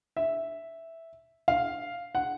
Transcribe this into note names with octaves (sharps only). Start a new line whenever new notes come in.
E5
F5
F#5